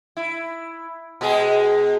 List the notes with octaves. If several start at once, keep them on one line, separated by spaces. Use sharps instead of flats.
E4
B2 G#3 G#4